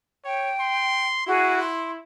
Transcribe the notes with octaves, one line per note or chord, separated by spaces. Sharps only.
C#5 G5
C6
E4 F#4 G#4
C6